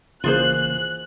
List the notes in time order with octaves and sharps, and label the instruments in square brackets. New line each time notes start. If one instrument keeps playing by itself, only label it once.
[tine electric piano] G#1 [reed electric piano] C#3 E3 A#3 [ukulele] F4 G#4 C5 [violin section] F#6